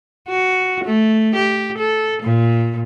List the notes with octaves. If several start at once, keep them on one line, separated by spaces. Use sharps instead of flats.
F#4
A3
G4
A4
A#2